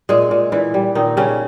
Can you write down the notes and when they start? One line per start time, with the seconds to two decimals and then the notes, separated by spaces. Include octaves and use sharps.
0.09 A#2 G#3 G#4
0.31 A#2
0.52 A#2 E3 E4
0.74 G3
0.95 A#2 D#3 D#4
1.17 C#3 G3 C#4